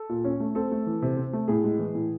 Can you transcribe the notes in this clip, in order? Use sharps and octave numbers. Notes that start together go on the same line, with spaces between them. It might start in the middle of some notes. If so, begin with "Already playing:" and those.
Already playing: A4
A#2
C#4
A3
C4 A4
A3
E3
C3
C4
A3
A2 G#4
G#3
E3
A2